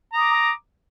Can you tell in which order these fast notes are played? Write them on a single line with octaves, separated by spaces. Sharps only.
A#5 D#6 D6